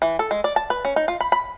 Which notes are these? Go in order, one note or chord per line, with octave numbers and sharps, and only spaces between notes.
E3
A4
G#3
D5
A5
B4
C#4
D#4
F4
B5
B5